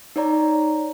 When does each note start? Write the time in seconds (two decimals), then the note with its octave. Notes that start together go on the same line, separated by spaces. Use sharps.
0.16 D#4 C#5 D5 A#5